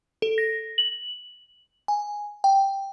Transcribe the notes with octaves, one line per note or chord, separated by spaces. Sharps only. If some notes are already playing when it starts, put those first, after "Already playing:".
A4
A#6
F#7
G#5
G5